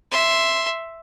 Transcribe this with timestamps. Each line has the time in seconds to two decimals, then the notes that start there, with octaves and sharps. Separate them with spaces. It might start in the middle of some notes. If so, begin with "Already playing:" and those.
0.12 E5 C6